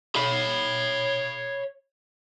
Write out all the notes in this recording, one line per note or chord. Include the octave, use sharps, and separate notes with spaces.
C#5 B5